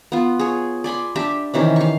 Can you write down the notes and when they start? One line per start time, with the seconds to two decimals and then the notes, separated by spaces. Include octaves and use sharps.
0.12 B3 F4
0.39 G#4 C#5
0.84 D5 G#5 B5 C6
1.16 D4 G4 E5
1.54 C3 D#3 E3 C#4
1.76 F5 C#6